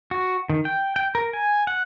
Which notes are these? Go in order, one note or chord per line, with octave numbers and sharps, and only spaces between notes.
F#4
D#3
G5
G5
A#4
G#5
F#5